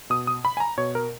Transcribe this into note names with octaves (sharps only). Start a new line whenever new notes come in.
B2 D#6
D#6
B5
G#5
A#5
B2 C#5
A#4